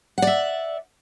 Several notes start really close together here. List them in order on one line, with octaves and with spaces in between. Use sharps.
F#5 D5 E5